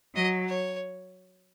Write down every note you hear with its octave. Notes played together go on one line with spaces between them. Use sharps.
F#3 D#5
C#5